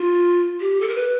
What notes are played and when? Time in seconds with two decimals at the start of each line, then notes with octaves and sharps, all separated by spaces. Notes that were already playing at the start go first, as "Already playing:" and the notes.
Already playing: F4
0.60 G4
0.81 A4
0.88 A#4
0.95 B4